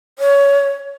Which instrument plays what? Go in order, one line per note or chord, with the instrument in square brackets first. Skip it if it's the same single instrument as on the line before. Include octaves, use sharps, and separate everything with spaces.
[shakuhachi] C#5